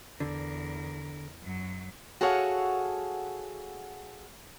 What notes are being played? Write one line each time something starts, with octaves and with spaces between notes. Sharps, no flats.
E2 D3 A#4
F#2 F#3
F#4 G#4 A4 C#5 F5 F#5